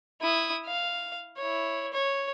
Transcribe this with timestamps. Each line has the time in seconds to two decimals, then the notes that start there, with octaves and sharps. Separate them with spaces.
0.21 E4 D#6
0.66 F5
1.38 E4 C#5
1.94 C#5